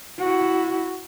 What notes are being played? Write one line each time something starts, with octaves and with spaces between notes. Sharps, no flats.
E4 F#4